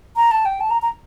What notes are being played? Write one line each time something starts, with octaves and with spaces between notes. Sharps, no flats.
A#5
A5
G5
A5
A#5
A#5